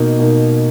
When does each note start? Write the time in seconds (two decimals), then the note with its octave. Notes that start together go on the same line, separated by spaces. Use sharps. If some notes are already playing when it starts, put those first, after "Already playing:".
Already playing: B2 A#3 D#4
0.19 B2 A#3 D#4